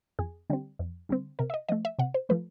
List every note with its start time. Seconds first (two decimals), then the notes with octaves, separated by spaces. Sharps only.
0.19 F2 G#4
0.50 D3 G3 C4
0.79 F2
1.09 D3 G3 C4
1.39 C3 A#4
1.50 E5
1.54 D#5
1.69 F3 A3 D#5
1.85 E5
1.99 C3 F#5
2.14 C5
2.29 F3 A3 B4